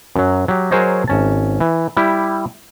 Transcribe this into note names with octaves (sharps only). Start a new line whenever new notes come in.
F#2 F#3
F#3 G4
F#3 G#4 A#4 C5 C#5 D#5
G#1 C#4 A5
E3
G3 E4 G4